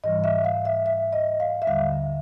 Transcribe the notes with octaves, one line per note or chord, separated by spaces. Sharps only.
G#2 E3 G3 D#5
E5
F5
E5
E5
D#5
F5
E5
D#2 D3 G3 F5